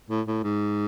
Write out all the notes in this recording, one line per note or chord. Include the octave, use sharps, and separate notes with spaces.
A2
A2
G#2